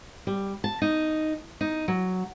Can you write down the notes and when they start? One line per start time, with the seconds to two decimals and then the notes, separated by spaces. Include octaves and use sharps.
0.27 G3
0.64 A5
0.82 D#4
1.61 D#4
1.88 F#3